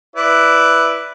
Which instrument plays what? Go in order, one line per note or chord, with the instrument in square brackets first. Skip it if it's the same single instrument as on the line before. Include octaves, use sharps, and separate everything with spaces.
[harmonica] E4 B4 D5